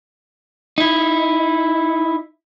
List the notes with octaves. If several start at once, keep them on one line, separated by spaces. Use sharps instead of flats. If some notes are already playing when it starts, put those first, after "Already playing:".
D#4 E4